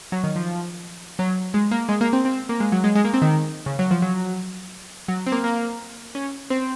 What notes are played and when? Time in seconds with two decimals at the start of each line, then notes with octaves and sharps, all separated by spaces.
0.12 F#3
0.24 D#3
0.36 F3
1.19 F#3
1.54 G#3
1.71 A#3
1.89 G#3
2.01 A#3
2.13 C4
2.25 C4
2.49 A#3
2.60 G#3
2.72 F#3
2.84 G#3
2.95 G#3
3.05 A#3
3.14 C4
3.22 D#3
3.66 C#3
3.79 F#3
3.91 F3
4.02 F#3
5.08 F#3
5.26 C4
5.32 A#3
5.44 A#3
6.15 C#4
6.50 C4